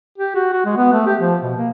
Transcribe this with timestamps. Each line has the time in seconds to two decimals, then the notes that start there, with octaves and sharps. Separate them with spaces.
0.18 G4
0.35 F#4
0.53 F#4
0.65 G#3
0.77 B3
0.92 A3
1.06 G4
1.20 F3
1.43 B2
1.57 A#3